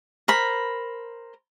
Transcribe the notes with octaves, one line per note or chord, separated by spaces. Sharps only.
A#4 C5 B5